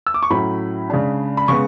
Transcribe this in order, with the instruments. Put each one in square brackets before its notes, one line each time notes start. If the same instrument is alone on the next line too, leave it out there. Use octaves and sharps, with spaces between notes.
[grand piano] E6
D6
C#6
A2 F#3 C#4 B5
C#3 G#3 D4
B5
C#3 G#3 B3 C#6